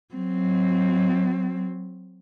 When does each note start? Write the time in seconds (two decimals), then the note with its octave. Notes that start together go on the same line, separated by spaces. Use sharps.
0.14 F#3 C4